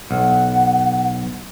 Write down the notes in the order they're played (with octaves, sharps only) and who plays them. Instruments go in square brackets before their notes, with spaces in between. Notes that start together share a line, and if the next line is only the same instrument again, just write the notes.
[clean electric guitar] B1 [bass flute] F#5